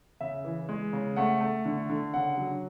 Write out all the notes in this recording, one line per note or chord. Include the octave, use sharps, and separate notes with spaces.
C#3 E5
E3
G#3
C#3
A3 F#5
A3
D3
D3
C#3 F#5
F#3